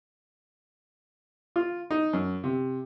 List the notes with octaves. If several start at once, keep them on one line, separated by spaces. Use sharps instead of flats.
F4
D#4
F#2
C3